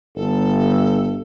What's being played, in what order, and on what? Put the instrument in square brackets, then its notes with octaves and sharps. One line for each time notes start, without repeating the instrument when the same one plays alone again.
[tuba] G1 [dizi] A4